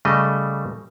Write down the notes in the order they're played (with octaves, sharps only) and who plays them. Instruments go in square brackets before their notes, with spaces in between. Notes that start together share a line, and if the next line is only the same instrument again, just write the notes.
[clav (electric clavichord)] C#3 G3 A3 D#5